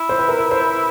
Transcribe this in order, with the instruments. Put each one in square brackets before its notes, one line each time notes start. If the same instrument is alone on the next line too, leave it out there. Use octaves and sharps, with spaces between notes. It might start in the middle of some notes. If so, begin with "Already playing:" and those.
Already playing: [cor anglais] E4
[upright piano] C5
B4
A#4
B4
C5